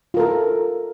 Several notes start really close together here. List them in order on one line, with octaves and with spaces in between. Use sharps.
F4 A#4 A4